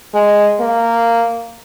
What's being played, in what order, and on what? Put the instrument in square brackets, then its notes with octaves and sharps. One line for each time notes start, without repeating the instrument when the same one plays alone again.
[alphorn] G#3
A#3